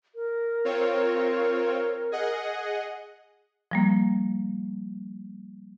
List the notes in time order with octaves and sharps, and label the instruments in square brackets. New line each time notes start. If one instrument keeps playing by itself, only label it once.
[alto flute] A#4
[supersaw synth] C4 F4 C#5
G#4 D#5 F#5
[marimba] F3 G3 A#3